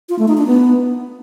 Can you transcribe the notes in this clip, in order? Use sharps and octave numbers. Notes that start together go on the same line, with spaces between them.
F4
A3
D#4
D4
B3